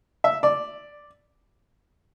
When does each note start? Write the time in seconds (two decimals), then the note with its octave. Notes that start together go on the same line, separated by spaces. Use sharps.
0.24 E5
0.43 D5